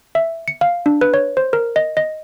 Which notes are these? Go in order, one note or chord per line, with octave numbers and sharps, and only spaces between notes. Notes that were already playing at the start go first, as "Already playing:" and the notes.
E5
C#7
F5
D4
B4
C#5
C5
A#4
D#5
D#5